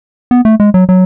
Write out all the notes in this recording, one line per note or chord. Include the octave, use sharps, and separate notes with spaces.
B3
A3
G#3
F#3
F#3